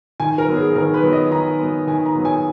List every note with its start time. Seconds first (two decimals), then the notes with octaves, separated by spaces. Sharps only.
0.20 D#3 G#5
0.38 A#4
0.47 F#3 B3
0.57 G#4
0.75 D#3 A#4
0.94 B4
1.03 F#3 B3
1.13 D#5
1.31 D#3 A#5
1.59 F#3 B3
1.87 D#3 G#5
2.06 A#5
2.15 F#3 B3
2.25 G#5